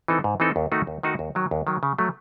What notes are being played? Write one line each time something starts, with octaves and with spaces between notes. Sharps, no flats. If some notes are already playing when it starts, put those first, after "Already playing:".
E3 C4 D#4 A4
G#2
E3 C4 D#4 A4
D#2
D#3 A3 D#4 F#4
D#2
D#3 A3 D#4 F#4
D#2
D#3 F#3
D#2
D#3 F#3
C#3
F#3 A3